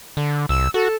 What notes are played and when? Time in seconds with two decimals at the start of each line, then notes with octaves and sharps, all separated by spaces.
0.17 D3
0.49 C2 E6
0.74 F#4 A4